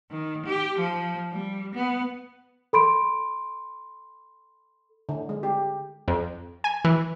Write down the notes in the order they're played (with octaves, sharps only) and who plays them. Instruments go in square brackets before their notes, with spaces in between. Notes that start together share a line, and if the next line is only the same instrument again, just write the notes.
[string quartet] D#3
G4
F3
G3
B3
[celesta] A4 B5 C6 D7
[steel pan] D3
G#3
G4
[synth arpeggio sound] F2
G#5
E3